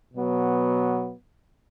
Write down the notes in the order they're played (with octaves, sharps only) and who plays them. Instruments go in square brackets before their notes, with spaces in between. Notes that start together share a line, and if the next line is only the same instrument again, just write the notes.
[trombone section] B2 F#3 B3